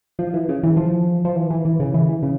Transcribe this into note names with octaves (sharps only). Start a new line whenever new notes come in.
F3
E3
C#3
E3
F3
F3
E3
E3
E3
C#3
E3
E3
C#3